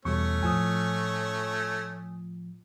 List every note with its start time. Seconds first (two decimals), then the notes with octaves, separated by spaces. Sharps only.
0.05 E2 B2 G3 A3 C#4 C#6
0.43 A2 F3 G#5 D#6